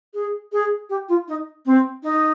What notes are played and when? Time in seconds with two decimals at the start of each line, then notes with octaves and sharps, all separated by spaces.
0.14 G#4
0.52 G#4
0.89 G4
1.08 F4
1.28 D#4
1.65 C4
2.03 D#4